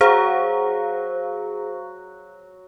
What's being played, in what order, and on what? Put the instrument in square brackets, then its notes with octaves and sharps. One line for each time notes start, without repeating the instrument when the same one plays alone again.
[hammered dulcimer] F#3 F#4 A#5 [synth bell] G#4 C5 F5